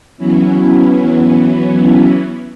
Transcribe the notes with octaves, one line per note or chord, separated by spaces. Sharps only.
E3 F#3 B3 C#4 E4